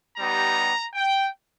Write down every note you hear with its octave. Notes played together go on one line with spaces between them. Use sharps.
G3 B3 D#4 G4 A#5
G5